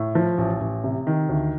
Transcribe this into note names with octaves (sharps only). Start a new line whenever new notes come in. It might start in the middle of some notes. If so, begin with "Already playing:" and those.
Already playing: A2
F3
A1
A1
C3
D#3
D2